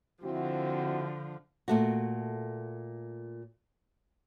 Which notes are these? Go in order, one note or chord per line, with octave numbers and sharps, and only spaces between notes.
D3 F3 C4 E4 F#4
A#2 A3 F#4